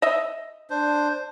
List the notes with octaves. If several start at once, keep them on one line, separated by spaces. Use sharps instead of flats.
D#5 E5
D4 C5